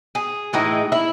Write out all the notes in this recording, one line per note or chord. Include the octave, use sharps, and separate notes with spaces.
G#4
A2 E3 G#3 D#4
E4